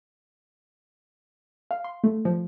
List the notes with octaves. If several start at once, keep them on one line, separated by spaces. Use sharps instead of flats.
F5
C6
A3
F3